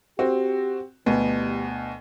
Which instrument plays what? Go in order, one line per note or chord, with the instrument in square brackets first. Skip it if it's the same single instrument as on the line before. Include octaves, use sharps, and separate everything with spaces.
[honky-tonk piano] C4 [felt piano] F#4 [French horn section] G4
[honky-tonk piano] D2 [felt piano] B2 B3 [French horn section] E3 G3 G4